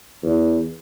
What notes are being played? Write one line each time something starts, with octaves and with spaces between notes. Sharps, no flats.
E2